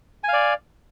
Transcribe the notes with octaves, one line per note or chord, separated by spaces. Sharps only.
D5 F5 G#5